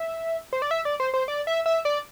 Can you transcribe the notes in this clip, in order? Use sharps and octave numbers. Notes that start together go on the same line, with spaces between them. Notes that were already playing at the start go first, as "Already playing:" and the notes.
Already playing: E5
C5
D5
E5
D5
C5
C5
D5
E5
E5
D5